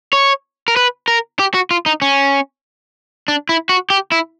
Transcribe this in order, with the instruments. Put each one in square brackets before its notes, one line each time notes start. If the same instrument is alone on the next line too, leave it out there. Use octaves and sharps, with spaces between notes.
[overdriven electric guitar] C#5
A#4
B4
A#4
G4
F#4
F4
D#4
C#4
D4
E4
F#4
G4
E4